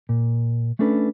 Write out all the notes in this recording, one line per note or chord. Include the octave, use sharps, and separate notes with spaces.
A#2
A3 C#4 D4 A4 B4